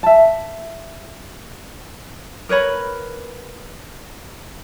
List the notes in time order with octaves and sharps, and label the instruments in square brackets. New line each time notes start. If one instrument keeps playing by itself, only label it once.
[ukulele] E5 A5
A#4 B4 C#5 B5